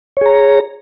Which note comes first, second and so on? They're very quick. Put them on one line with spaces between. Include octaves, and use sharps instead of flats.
C#5 G#4 A#5